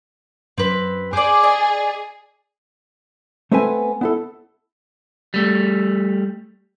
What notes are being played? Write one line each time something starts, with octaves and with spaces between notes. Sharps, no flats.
F#2 C4 B4
G#4 C5 D5 D6
D5 D#5
A3 B3 C4 A4 B4 G#5
B3 E4 A4
G3 A3